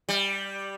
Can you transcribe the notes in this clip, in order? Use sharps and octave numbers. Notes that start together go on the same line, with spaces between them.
G3